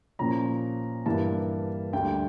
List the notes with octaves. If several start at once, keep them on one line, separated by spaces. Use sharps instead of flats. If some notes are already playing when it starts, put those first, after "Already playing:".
A#2 F3 C#4 A#5
G2 E3 A#3 A5
D2 D3 G3 G5